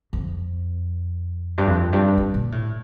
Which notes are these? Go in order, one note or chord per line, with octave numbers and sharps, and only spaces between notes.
F2
G2
F2
G2
G2
A#2
A2